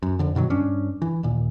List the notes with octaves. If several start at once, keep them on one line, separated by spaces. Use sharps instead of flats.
F#2
F#1 F2 D3
G2 B2 D#3 F#3
G2 C#4 D4
E3
D#2 A#2